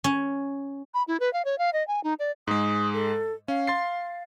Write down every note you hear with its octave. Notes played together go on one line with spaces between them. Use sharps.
C#4
B5
E4
B4
F5
C#5
F5
D#5
G#5
D#4
D5
G#2 G#3 D#6
A4
C#4 F5
C6 A6 C7